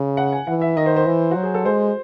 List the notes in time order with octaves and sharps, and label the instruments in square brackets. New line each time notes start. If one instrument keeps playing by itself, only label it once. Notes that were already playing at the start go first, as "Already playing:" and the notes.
Already playing: [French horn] C#3
[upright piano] F#5
G#5
[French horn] E3 [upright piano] F#5
[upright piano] E5
[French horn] D#3 [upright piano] D#5
[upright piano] C5
C5
[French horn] E3
[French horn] F#3 [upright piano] F#4
[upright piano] G#4
A4
[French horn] G#3 [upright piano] C5